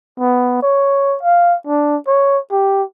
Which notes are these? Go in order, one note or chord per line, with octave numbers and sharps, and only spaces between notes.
B3
C#5
F5
D4
C#5
G4